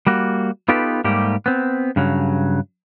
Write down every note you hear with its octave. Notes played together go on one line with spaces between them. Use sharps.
G3 A#3 F#4
B3 D#4 F4 G4 A4 B4
G#2 G3 A3 A#3 G4
B3 C4
G2 C#3 F#3